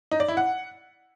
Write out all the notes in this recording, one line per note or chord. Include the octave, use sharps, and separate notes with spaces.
D#4
D5
E4
F#5